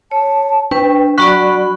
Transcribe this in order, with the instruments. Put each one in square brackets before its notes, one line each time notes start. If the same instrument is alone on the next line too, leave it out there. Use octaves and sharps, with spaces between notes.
[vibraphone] C#5 [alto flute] A5
[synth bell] D4 [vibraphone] B4 [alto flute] G5
[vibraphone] F#3 F#4 D5 [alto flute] B5 [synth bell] C#6 F#6